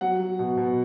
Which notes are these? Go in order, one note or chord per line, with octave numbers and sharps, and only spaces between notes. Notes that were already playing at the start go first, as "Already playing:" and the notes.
F#3 F#5
F#3
B2
B2